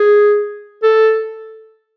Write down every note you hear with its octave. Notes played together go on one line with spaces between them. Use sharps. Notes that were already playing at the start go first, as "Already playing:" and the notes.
Already playing: G#4
A4